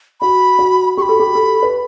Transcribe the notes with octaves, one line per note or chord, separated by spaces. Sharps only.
F#4 B5
F#4
G4 B5 C#6
A4
G4
A4
B4